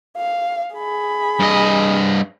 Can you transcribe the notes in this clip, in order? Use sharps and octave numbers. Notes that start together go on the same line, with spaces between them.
F5
G#4 B5
G2 D#5